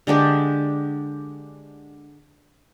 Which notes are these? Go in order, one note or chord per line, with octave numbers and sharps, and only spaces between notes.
D3 G#3 D4 G4